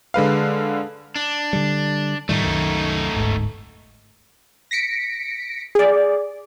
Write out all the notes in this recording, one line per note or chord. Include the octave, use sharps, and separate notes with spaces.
D3 G#3 B4 F5
D4
D3 G3
A2 D#3 G3 A3 D#4
C2 F#2 D#3
D1 G1 G#2
A#6 B6 C#7 D7
G#4 D5